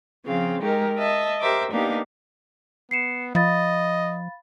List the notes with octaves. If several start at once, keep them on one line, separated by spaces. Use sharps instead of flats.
C#3 F3 C4 F5
G#3 D#4 G4 A#4
D#5 E5 A5
G4 A#4 C5 E5 D6
A#3 B3 D4 D#4 G4 F5
B3 C7 C#7 E7
F3 D#5 F5 B5 A6